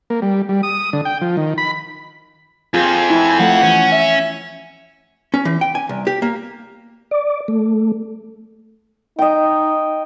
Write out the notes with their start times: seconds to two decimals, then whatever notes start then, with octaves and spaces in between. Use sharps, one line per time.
0.10 A#3
0.22 G3
0.49 G3
0.63 D#6
0.93 D3
1.05 G5
1.21 F3
1.37 D#3
1.58 B5
2.74 F2 C4 F4 G#4 G#5
3.10 E4
3.39 F3 A3 F#5
3.63 E3 C#4
3.92 E5
5.34 C#4
5.45 E3
5.61 G5
5.75 G#5
5.89 C2
6.07 G4
6.22 A#3
7.11 D5
7.48 A3
9.19 D#4 D#5 G5